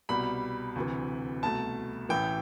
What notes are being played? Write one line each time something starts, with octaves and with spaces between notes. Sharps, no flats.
C2 B2 G3 B5
D2 C3 E3
C2 B2 A3 A5
A1 A2 E3 G5